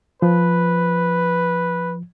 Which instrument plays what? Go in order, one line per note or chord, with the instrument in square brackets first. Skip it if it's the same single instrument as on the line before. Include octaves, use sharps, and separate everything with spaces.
[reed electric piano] F3 [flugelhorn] B4